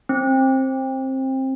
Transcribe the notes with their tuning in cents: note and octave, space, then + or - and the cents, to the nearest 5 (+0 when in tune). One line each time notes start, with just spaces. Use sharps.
C4 +20